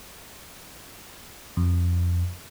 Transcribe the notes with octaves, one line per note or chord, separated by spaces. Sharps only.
F2